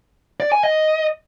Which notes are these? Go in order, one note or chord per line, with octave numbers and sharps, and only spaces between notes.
D5
G#5
D#5